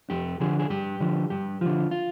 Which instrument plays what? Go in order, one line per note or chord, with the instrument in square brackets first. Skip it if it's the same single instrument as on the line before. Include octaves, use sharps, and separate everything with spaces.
[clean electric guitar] F2 G4
D3 F3 G#4
G#4
G2 G4
D3 F3
G2 G4
D3 F3 F4
F4